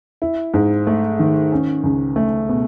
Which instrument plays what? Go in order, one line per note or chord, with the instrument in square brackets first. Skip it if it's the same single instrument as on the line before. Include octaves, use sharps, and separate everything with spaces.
[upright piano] E4
G#2
A3
D#3
C#4
C#2
A3
B2